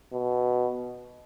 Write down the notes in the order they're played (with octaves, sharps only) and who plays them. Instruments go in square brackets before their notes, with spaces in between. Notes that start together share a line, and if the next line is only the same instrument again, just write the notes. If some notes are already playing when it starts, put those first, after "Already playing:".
[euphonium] B2